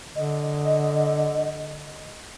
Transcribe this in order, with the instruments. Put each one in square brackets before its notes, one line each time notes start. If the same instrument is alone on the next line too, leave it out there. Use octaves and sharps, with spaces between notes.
[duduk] D3 [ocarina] D#5